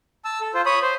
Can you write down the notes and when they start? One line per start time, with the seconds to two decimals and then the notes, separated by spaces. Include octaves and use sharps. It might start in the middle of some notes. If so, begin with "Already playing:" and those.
0.25 A5 E6
0.41 A4
0.54 F4 C5
0.66 C#5 B5 D#6
0.82 C5